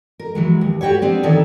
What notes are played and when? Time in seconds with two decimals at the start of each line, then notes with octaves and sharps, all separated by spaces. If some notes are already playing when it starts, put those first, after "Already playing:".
0.19 A#4
0.35 E3 F#3 G#3
0.61 D#2
0.81 F#4 G4 B4 C#5
1.02 B3 C4 D4
1.23 D#3 E3 D#4 A4 C#5 D5